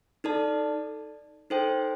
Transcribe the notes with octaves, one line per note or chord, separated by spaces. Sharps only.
D#4 A4 D5 A5
D#4 A4 C5 G5